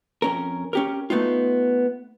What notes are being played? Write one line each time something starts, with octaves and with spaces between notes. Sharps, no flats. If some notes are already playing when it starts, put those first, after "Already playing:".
F2 C#4 A#4
C#4 G4 A#4
A3 B3 D#4 F4